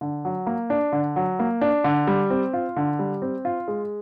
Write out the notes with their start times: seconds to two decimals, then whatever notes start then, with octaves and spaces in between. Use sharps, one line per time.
0.01 D3
0.25 F#3
0.46 A#3
0.70 D4
0.92 D3
1.16 F#3
1.39 A#3
1.61 D4
1.84 D3
2.07 G3
2.30 C4
2.53 F4
2.76 D3
2.99 G3
3.22 C4
3.45 F4
3.68 G#3